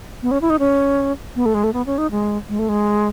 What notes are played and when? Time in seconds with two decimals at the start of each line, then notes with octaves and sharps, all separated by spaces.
0.23 B3
0.31 C#4
0.42 E4
0.50 D#4
0.59 C#4
1.36 B3
1.46 A3
1.54 G#3
1.64 A3
1.73 B3
1.86 C#4
1.98 D#4
2.11 G#3
2.49 G#3
2.59 A3
2.69 G#3